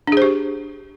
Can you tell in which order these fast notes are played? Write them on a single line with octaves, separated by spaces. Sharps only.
D4 G#4 C5 G4